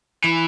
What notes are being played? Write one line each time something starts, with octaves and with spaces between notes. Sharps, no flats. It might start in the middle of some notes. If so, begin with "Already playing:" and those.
E3